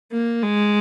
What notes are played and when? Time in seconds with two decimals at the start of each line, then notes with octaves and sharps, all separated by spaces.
0.12 A#3
0.43 G#3